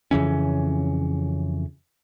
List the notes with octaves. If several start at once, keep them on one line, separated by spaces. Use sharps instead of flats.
F2 C#3 E3 C#4